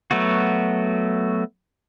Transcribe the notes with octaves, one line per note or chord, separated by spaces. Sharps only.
F#3 A3 B3 F#4